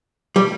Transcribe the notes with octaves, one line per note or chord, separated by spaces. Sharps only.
G3